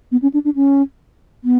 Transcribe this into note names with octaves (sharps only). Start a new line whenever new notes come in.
B3
C#4
D4
D4
C#4
B3